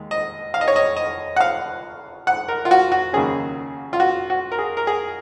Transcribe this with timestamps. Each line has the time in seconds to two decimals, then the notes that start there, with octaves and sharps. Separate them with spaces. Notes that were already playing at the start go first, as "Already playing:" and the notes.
Already playing: D#2 G#3
0.11 D#5
0.54 F5
0.61 D#5
0.68 C#5
0.76 D#5
0.97 D#5
1.36 F#5
1.40 F5
2.27 F#5
2.48 A#4
2.65 F4
2.71 F#4
2.92 F#4
3.13 D#2 C#3 F#3 A#3 C#4 G#4
3.93 F4
4.00 F#4
4.30 F#4
4.52 A#4
4.59 G#4
4.77 A#4
4.87 G#4